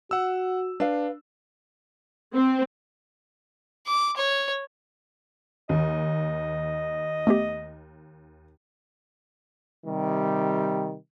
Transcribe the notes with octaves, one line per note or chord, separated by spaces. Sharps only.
F#4 F#5 E6
D4 B4 F5
C4
D6
C#5
D#2 D#5
A3 B3 G4
C3 D#3 G3